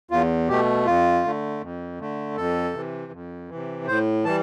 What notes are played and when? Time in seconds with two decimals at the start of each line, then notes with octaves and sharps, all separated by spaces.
0.11 E2 F4
0.49 B2 A3 G4
0.86 F2 F4
1.24 D3 A3
1.61 F2
1.99 D3 A3
2.37 F2 A4
2.74 C3 E3
3.12 F2
3.49 E3
3.54 C3
3.88 A2 C5
4.25 E3 G3 A5